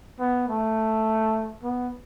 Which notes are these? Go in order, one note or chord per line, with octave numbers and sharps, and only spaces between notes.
B3
A3
B3